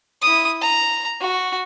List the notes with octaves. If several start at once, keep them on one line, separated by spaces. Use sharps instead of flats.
E4 D#6
A#5
F#4